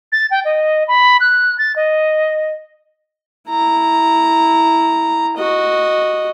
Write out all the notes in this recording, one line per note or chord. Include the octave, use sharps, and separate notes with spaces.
A6
G5
D#5
B5
F#6
A6
D#5
E4 A#5
F#4 D#5